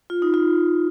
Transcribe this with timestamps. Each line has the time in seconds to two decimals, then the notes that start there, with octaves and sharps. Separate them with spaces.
0.10 F4
0.22 D#4
0.34 F4